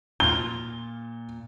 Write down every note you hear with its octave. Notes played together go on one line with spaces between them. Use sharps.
A#2 F4 G7